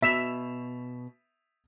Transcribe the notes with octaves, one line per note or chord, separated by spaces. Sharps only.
B2 E5 B6 E7 F7